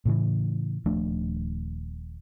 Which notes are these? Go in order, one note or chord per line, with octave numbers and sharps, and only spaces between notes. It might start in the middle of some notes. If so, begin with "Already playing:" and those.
A2 C#3 E3
D#1 F3 A3 D4